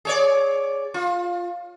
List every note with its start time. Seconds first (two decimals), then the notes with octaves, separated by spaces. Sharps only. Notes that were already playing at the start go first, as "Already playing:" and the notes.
0.05 G#4 C#5 D5
0.94 F4